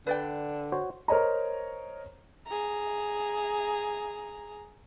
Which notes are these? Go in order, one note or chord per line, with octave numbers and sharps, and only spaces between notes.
D3 B4 D5 G5
F#4 C5 C#5
A#4 C5 C#5 D#5 A#5
G#4 A#5